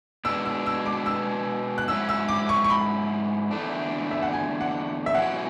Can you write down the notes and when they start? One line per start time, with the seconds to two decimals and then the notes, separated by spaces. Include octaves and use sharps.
0.25 B2 G#3 B3 D4 E6
0.46 E6
0.66 E6
0.86 D6
1.06 E6
1.78 F#6
1.88 G#2 F#3 C#4 E4 E6
2.09 E6
2.28 D6
2.49 C#6
2.64 C#6
2.70 B5
3.51 E2 D3 A3 D4
4.11 E5
4.22 F#5
4.33 G#5
4.61 F#5
5.06 E5
5.15 B2 F#3 C#4 E4 F#5